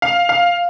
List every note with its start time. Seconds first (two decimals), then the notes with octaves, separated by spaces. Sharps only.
0.02 F5
0.29 F5